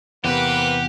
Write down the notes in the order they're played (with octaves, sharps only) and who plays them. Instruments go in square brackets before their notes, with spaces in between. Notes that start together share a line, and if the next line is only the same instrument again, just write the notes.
[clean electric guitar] E2 C3 [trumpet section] A#3 C4 B4 [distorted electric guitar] G4 [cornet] F#5